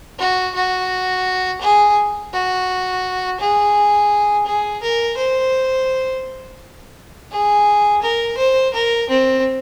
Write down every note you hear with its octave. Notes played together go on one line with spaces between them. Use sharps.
F#4
F#4
G#4
F#4
G#4
G#4
A#4
C5
G#4
A#4
C5
A#4
C4